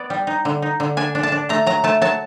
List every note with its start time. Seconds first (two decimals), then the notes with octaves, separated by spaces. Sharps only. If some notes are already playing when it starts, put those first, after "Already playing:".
Already playing: B3 D5
0.10 G3
0.27 D#4
0.45 D3
0.62 D#4
0.80 D3
0.97 D4 G#5
1.15 D4
1.23 A5
1.32 D4
1.49 A3 A#5
1.66 F#3 A#5
1.84 A3 A5
2.01 F#3 A5